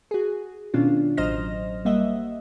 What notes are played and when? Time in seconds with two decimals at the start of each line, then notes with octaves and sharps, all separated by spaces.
0.11 F#4 G#4
0.74 B2 D#3 C#4 D4 F4
1.17 A1 F#3 C5 D#5 F6 A#6
1.85 G3 A#3 D#5 E5 F#5